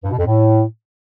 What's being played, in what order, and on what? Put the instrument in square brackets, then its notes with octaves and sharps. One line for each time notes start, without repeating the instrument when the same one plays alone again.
[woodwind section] G2
B2
F2
A2